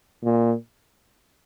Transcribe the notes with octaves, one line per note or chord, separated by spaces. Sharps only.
A#2